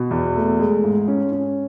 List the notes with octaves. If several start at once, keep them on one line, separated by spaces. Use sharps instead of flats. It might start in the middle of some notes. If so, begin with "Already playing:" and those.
Already playing: B2
E2
A3
G#3
G#2
C#4
C#4